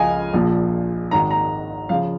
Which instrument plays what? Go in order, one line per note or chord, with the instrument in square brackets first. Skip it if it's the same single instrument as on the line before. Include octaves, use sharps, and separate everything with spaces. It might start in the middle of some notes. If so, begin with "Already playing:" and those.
Already playing: [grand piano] C#2 C#3 F3 D#5 F5 G#5
A#1 A#2 F3
G#1 G#2 D#3 A#5
A#5
C#3 F3 F5